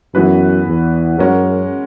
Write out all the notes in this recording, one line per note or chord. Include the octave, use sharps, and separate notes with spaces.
F#2 E3 B3 F#4 B4
E2
F#2 G#3 C#4 F#4 A#4 C#5